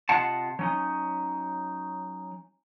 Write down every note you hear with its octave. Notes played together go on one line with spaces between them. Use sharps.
C3 F4 D#5 F#5 A5
F#3 C#4 D#4